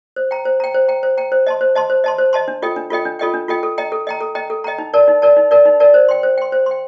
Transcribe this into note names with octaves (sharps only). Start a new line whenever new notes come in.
C5
G5 A#5
C5
G5 A#5
C5
G5 A#5
C5
G5 A#5
C5
D#5 A5 C6
C5
D#5 A5 C6
C5
D#5 A5 C6
C5
D#5 A5 C6
D4
F4 A4 D#5 G5
D4
F4 A4 D#5 G5
D4
F4 A4 D#5 G5
D4
F4 A4 D#5 G5
A4
D#5 G5 A#5
A4
D#5 G5 A#5
A4
D#5 G5 A#5
A4
D#5 G5 A#5
D#4
A#4 D5 A5
D#4
A#4 D5 A5
D#4
A#4 D5 A5
D#4
A#4 D5 A5
C5
G5 C6
C5
G5 C6
C5
G5 C6